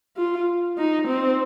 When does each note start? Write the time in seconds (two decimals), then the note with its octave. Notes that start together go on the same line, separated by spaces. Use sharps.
0.17 F4
0.78 D#4
1.08 C4